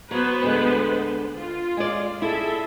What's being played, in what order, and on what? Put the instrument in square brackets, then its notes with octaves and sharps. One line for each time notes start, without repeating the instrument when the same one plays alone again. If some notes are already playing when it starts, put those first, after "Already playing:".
[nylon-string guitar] F#3 [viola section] B3 B4 C5
[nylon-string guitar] D2 D3 G#3
[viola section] F4
[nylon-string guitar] G#3 D5
[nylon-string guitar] E4 [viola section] G#4 A4 E5